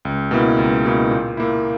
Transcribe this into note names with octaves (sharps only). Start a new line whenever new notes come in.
C#2
B2 A#3 E4
C#2
B2 A#3 E4
A#2
A#3 E4